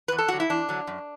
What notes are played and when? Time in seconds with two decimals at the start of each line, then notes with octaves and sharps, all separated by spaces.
0.08 E2 B4
0.18 A4
0.28 D3 F#3 F#4
0.40 E4
0.50 E2 D4
0.69 D3 F#3
0.87 F#2